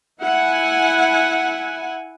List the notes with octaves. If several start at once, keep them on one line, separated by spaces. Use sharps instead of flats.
E4 F#5 G#5